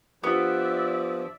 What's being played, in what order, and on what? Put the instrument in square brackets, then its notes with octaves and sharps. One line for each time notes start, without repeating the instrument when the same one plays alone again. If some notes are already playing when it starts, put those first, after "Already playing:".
[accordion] F3 [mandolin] B3 [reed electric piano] D4 F4 G4 [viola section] D5 E5